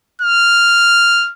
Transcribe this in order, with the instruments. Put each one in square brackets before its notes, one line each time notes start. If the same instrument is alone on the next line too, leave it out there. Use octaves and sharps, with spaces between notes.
[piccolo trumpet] F6